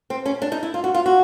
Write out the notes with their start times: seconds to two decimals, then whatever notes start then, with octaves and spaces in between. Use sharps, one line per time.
0.10 C4
0.26 C#4
0.42 D4
0.52 D#4
0.63 E4
0.74 F4
0.84 F#4
0.94 F4
1.06 F#4